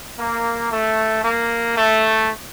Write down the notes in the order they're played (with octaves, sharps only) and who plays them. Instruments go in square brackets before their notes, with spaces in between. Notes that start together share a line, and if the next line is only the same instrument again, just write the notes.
[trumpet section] A#3
A3
A#3
A3